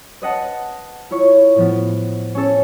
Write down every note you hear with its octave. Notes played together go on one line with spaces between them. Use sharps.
B4 D#5 F#5 A5
E4 F4 C#5 C#6
A2 F3 B3
C#4 A4